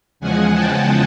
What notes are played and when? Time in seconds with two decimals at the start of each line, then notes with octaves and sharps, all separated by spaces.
0.20 E2 C#3 F3 G#3 F#5 G#5
0.53 G5 A5